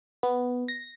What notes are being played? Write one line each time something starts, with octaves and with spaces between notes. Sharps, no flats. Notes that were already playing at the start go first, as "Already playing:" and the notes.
B3
A#6